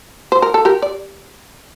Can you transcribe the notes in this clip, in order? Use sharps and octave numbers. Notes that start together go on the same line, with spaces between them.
C5
A#4
A4
G4 A#4
D5